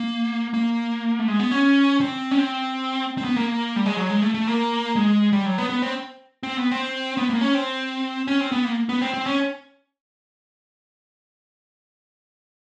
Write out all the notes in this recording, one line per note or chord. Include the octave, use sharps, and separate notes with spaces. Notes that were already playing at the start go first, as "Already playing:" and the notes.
Already playing: A#3
A#3
A3
G#3
B3
C#4
C4
C#4
C4
C4
B3
A#3
G3
G#3
F#3
G#3
A3
A3
A#3
G#3
G3
F#3
B3
B3
C4
C4
B3
C4
B3
A#3
C#4
C4
C#4
C4
B3
A#3
B3
C4
C4
C#4